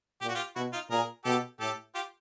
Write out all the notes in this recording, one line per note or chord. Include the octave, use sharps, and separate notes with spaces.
A#2 G4
F#4
F4 G4
B2 E4 F#4
D#4 F4
A#2 G#4 A#4
B2 G4 A4
A2 G4 A4
F4 G4